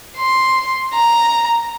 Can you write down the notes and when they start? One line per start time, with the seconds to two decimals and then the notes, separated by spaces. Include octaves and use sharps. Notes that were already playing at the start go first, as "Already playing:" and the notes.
0.18 C6
0.94 A#5